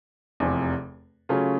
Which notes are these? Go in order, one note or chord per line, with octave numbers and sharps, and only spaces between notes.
F1 E2 C3 F3
C#3 F#3 A3 C#4 F4